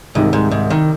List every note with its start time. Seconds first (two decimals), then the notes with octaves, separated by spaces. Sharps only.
0.15 C2 G#2 C3 D#3
0.33 G#2
0.51 G#2
0.70 D#3